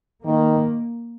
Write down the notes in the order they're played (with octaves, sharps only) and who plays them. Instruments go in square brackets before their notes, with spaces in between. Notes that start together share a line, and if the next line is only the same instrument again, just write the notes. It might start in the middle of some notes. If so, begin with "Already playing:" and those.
[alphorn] D#3 [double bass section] A#3